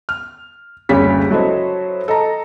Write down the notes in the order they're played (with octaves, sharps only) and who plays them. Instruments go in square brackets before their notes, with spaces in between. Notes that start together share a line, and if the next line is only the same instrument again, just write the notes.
[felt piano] F6
F#1 D2 C#3 G3 C#5 B6
F#3 E4 A4 C5 C#5 D#5
A4 D#5 A#5